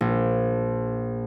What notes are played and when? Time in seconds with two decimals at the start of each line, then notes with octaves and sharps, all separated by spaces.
0.01 A#1